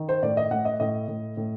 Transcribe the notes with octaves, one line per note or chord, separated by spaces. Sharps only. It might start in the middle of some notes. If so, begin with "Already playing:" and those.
Already playing: D#3
C5
A2 D5
D#5
A2 F#5
D#5
A2 D#5
A2
A2